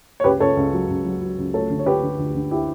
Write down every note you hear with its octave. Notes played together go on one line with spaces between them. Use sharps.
C#5
C#2 G4 B4
C#2 A4 C#5
C#2
F#3
C#2
F#3
F#3
C#2
A3 A4 C#5
D3
C#5
D3 G4 B4
D3
D2
D3
E4 G4